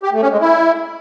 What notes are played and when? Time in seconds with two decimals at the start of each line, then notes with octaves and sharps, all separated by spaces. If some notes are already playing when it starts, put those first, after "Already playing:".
0.03 G4
0.13 A3
0.22 C#4
0.31 G#3
0.41 E4